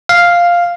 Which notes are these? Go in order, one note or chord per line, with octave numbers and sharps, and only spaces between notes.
F5